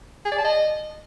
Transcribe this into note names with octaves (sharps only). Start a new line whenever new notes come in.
G#4
D5
A5
D#5